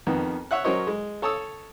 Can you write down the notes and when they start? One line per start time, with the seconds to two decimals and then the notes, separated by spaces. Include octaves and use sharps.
0.07 F2 D#3 B3
0.51 C#5 E5 F#5 F#6
0.64 F#3 C#4 A#4 C5 C#5 D#5
0.87 G#3
1.22 A4 C#5 A5 D#6 E6